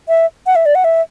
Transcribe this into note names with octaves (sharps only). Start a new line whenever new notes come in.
E5
F#5
E5
D5
F#5
E5